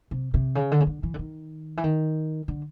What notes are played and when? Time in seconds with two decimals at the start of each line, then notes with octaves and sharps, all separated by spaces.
0.11 C3
0.34 C3
0.55 C#3
0.72 D3
0.80 C#3
0.87 D3
1.03 E3
1.14 D3
1.19 D#3
1.77 E3
1.84 D#3
2.48 D3